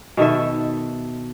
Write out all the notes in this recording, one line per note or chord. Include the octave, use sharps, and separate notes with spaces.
B2 D#3 A4 E5